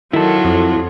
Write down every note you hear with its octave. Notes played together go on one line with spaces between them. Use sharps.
D#3 F#3 E4 F4 A4
F2